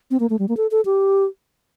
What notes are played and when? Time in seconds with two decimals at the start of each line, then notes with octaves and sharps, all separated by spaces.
0.11 C4
0.20 A#3
0.30 A3
0.39 G3
0.49 A#3
0.57 A4
0.71 A4
0.85 G4